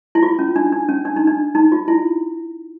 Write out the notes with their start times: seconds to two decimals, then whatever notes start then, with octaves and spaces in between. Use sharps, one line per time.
0.15 E4
0.23 F4
0.39 C#4
0.56 D4
0.72 D4
0.89 C#4
1.05 D4
1.16 D#4
1.27 D4
1.55 D#4
1.72 F4
1.88 E4